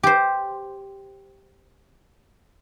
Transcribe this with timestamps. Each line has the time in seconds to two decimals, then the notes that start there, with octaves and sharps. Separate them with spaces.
0.03 G4 C5